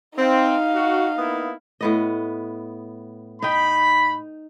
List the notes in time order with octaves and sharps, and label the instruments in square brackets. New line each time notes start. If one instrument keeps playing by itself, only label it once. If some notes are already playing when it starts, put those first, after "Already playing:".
[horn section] C4 [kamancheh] D#4 F5
[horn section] F#4
A#3 B3 E4
[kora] A2 B3 D#5
[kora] D#4 G5 [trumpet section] B5